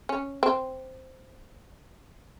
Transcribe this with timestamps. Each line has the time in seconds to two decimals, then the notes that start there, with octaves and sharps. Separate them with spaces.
0.09 C#4
0.43 C4